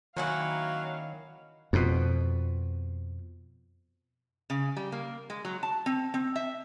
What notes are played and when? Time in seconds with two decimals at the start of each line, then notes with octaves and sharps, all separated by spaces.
0.17 D#3 F#3 A#3 C#4 E4 F5
1.73 F2 B2
4.50 C#3
4.76 G3
4.92 A#3
5.30 G#3
5.45 F#3
5.63 A5
5.86 C4
6.14 C4
6.36 E5